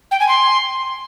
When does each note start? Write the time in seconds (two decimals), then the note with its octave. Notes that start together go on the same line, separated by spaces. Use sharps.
0.11 G5
0.20 G#5
0.28 C6